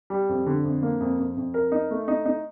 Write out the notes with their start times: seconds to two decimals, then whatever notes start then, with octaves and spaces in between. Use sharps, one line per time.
0.10 G3
0.29 F2
0.46 D3
0.64 F2
0.83 A#3
1.01 F2
1.19 F2
1.37 F2
1.54 A#4
1.72 D#4
1.91 A3
2.08 D#4
2.25 D#4